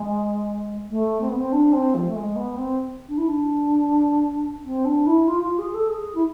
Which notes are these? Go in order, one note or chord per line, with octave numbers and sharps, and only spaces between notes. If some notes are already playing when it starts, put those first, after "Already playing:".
Already playing: G#3
A3
C4
B3
C4
D4
C4
F3
A3
G#3
B3
C4
D4
E4
D4
C4
D4
E4
F4
F4
G#4
A4
G#4
E4